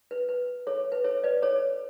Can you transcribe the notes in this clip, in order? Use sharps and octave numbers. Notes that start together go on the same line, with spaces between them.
B4
B4
A4 C#5
B4
A4 C#5
B4 D5
A4 C#5